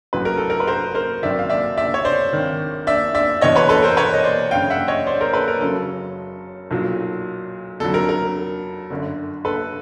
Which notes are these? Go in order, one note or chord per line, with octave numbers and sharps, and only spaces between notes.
A1 A2 F#3 B4
A#4
A4
A#4
B4
A#4 C5
A#4 C5
G#1 F#2 D#3 F#3 D5 E5
F5
D5 E5
D5 E5
C#5
C5 D5
G#1 G2 D#3
D5 E5
D5 E5
E1 E2 B2 C#5 D#5
B4 C#5
A4 B4
A#4 C5
B4 C#5
D#5
C5 D5
G1 F#2 C#3 F5 G5
E5 F#5
C#5 D#5
C5 D5
A#4 C5
A4 B4
A#4
F#1 F#2 C#3 F#3 A4
B1 A#2 F#3
F2 D3 F#3 A4
A#4
A#4
G1 F#2 D3
A4 B4